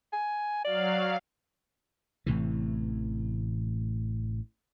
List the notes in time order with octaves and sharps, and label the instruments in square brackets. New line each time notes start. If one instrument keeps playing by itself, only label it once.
[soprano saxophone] G#5
[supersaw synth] F#3 F5 [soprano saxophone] D5
[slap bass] A1 A2 C3 E3